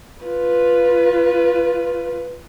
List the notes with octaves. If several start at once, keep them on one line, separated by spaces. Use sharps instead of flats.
F4 B4